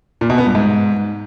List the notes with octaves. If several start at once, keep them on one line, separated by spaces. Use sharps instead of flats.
A#2
B2
B3
G2
G#2